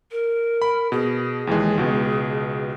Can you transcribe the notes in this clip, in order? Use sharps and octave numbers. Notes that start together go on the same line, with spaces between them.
A#4
B5
B2 G#4
D#2 E3 G#3
C#2 B2